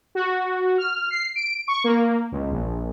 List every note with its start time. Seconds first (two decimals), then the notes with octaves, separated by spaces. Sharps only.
0.15 F#4
0.78 F6
1.11 C7
1.35 D7
1.68 C#6
1.84 A#3
2.32 C#2
2.51 A#1